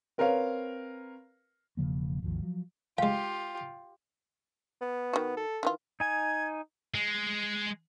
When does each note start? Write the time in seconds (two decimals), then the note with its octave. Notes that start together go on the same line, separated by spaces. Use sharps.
0.18 C4 A#4 B4 C#5 F5
1.77 E1 C#3 F3 A#3
2.22 G#1 D#2 F3
2.42 F3 F#3
2.98 G#3 F4 G4 F5 G5
4.81 B3
5.13 D#3 F#4
5.37 A4
5.63 D#3 E3 F4
6.00 D#4 G#5 G#6
6.94 G#3